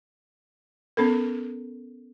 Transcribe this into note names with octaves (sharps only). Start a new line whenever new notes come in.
B3 C#4 A4 A#4